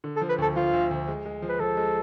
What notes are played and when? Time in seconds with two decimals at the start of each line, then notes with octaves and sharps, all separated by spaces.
0.04 D3
0.16 A4
0.21 F3
0.29 B4
0.38 D2 A4
0.56 F3 F4
0.73 D2
0.91 D2
1.08 G#3
1.25 G#3
1.42 F3
1.49 B4
1.60 F3 A4
1.77 G#3